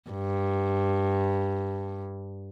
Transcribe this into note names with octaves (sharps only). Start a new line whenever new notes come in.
G2